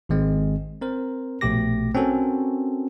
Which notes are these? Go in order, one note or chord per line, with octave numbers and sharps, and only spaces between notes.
G#1 D#3 G#3 C4
C4 A#4 C5
A#1 B2 A3 G4 D6 A#6
C4 C#4 F#4 A4 A#4